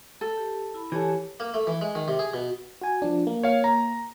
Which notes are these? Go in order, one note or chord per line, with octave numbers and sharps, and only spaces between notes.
A4
G4
E4 B5
E3 G4 A4 C#5 G#5
A#3
A3
E3
G#3
D#3
C3
G#4
B2
F#4 G#5
F3 D4
A#3
C#5 F5
A#5